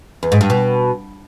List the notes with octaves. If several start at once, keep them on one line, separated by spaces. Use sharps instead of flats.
E2
G#2
G2
B2